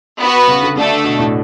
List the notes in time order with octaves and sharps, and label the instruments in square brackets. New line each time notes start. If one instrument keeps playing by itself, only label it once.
[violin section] B3 F#4 B4
[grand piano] C#3
D3
[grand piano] D3 [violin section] A3 D4 A4
[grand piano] B2
A2